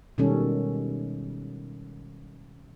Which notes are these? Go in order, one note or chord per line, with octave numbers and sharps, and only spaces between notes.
B2 D#3 G3 G#3 C#4 A4